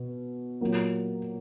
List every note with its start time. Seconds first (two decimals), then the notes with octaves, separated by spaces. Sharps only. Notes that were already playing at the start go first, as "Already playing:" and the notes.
Already playing: B2
0.61 A#2 F#3 A#3